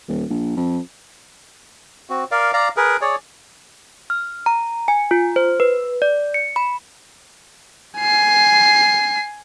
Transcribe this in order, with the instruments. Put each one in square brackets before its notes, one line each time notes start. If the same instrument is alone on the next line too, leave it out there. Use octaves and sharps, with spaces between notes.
[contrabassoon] D#1
A#1
F2
[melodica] C4 F#4
A#4 D5 F5
D5 F5 A#5
G#4 A#4 B4
G#4 C#5 D5
[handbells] F6
A#5
G#5
F4
C5
B4
D5
C#7
B5
[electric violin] G#5 C7